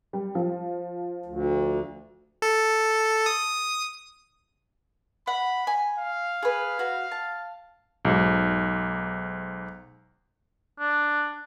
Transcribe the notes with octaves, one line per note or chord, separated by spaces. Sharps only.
G3
F3
D2
A4
D#6
F#5 B5
G#5
F5
G#4 B4
F#4
A5
B1 G#2
D4